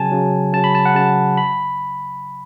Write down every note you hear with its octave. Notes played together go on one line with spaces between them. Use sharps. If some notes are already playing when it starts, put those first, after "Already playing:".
Already playing: C#3 F#3 G#5 A5
C#3 F#3
C#3 F#3 A5
B5
A5
F#5
C#3 F#3 A5
B5